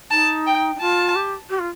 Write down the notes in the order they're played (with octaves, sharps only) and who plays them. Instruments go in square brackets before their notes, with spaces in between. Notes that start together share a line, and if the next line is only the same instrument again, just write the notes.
[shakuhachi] D#4 [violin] A5
[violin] G5
[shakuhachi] D#4
[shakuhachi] F4 [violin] A5
[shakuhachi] G4
G4
F4